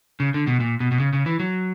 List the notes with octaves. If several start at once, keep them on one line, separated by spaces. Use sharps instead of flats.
C#3
D3
B2
A#2
B2
B2
C#3
C#3
E3
F#3